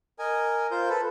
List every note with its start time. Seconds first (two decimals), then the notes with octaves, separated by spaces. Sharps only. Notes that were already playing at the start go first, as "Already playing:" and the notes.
0.19 A#4 D#5 G#5
0.71 F4 A#4 C5 G6
0.89 A4 B4